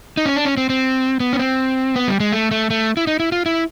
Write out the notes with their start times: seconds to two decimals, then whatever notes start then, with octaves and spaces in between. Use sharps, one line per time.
0.17 D#4
0.26 C#4
0.36 D4
0.45 C#4
0.57 C4
0.70 C4
1.20 B3
1.33 C#4
1.39 C4
1.96 B3
2.08 G3
2.20 G#3
2.33 A3
2.51 A3
2.70 A3
2.97 E4
3.07 D#4
3.20 E4
3.32 F4
3.46 E4